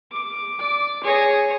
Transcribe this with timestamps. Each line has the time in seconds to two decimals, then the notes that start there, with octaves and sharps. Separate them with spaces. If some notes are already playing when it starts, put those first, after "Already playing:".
0.12 D6
0.59 D5
1.04 G#4 C#5 A#6